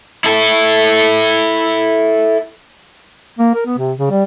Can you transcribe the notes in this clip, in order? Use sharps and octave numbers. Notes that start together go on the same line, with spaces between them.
E4 A4
A#3
A#4
B3
C3
C#3
G3